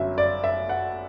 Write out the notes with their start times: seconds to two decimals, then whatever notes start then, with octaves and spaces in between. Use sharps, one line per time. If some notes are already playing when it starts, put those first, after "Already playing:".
Already playing: G1 F#2 F#3 E5
0.18 D5
0.44 E5
0.69 F#5